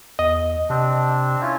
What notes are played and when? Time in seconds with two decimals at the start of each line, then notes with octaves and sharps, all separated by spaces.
0.19 E2 D#5
0.70 C3 C4 D4
1.41 C#4 E4 F4